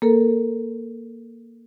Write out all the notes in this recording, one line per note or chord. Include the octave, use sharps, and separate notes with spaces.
A#3 A4 A#4